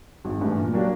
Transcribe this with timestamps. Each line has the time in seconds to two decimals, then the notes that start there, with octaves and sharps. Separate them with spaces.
0.25 G#1
0.41 G2 E3 A3
0.58 A#2
0.73 F#3 A#3 D4 G4